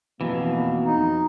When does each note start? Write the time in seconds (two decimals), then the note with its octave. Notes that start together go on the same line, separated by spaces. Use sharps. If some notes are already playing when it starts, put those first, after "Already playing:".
0.21 F2 G#2 B2 E3 A#3
0.85 D#4